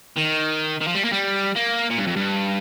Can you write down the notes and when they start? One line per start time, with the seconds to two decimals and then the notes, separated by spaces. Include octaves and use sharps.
0.18 D#3
0.81 D#3
0.87 F3
0.95 G3
1.04 A#3
1.12 G3
1.56 A#3
1.90 A#2
1.98 G2
2.07 F2
2.16 G2